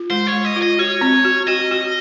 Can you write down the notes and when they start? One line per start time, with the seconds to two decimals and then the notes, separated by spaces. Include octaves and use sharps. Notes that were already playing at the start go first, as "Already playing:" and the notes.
Already playing: F4
0.10 G#3 C5
0.27 C#5
0.32 G#3
0.45 D#5
0.56 F4
0.62 D#5
0.79 F#4 C#5
1.01 C4
1.24 F#4
1.47 F#4 D#5
1.71 F#4